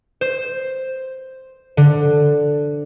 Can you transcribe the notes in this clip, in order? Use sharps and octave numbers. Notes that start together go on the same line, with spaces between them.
C5
D3